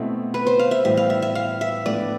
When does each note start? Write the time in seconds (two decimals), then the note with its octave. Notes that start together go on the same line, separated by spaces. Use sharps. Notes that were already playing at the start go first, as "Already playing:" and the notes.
Already playing: B2 A3 C4 E4
0.34 B4
0.47 C5
0.59 F5
0.71 E5
0.84 A2 E3 G3 B3 E5
0.97 F5
1.10 E5
1.22 E5
1.35 F5
1.61 E5
1.86 A2 F3 B3 D4 A4 D5